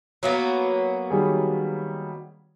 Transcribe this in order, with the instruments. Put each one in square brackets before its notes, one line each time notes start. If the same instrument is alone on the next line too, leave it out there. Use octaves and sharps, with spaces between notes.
[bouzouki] F#3 A#3 B3
[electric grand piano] D#3 G3 G#4